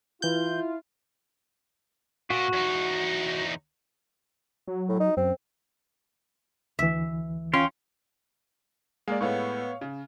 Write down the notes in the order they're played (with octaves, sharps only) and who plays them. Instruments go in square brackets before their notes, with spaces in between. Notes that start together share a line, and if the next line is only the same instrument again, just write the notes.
[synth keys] E3 G6 [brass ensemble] E4 F4
[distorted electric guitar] A#2 [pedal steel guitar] F#4
[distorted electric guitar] E2 D#4
[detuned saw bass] F#3
[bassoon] A2
D#4
[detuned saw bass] F#2 [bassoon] C4
[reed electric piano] D2 E3 [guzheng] E5
[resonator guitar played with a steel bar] C#4 F4 [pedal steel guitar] F5 G5 C6
[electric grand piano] G#3 A#3 D5 [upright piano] F5
[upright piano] A2 G#3 A3 [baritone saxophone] B3 [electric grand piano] C#5 F5 C#6
[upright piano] C#3